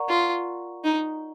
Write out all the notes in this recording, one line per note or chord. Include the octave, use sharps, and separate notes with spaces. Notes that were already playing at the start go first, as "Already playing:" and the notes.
Already playing: A#4 D5 F#5 A#5 C#6
F4
D#4